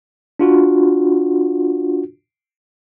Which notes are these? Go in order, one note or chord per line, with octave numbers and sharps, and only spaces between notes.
D4 F4 F#4